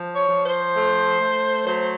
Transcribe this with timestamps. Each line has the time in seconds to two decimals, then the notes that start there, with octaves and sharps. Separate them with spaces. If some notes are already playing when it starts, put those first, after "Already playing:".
Already playing: F3
0.14 C#5
0.29 F3
0.45 C5
0.75 A3
1.20 A3
1.66 F#3 C5